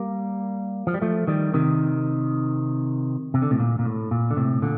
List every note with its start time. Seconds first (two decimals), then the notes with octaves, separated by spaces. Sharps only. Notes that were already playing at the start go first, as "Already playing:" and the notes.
Already playing: G3 A#3
0.87 F3
0.94 G3
1.02 F3 A3
1.27 D#3 G3
1.54 C3 D#3
3.34 C3
3.42 D3
3.51 A2 C3
3.59 A#2
3.79 A#2
3.85 A2
4.11 A#2
4.31 D3
4.36 A2 C3
4.62 A#2 D3